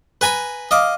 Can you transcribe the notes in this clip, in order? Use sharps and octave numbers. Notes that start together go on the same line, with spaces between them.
B4 G#5 A#5 B5
D#5 F5 D6